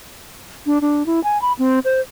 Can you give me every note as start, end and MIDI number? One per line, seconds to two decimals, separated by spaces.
0.66 0.81 62
0.81 1.05 62
1.06 1.22 64
1.24 1.40 80
1.42 1.53 83
1.59 1.79 60
1.85 2.01 72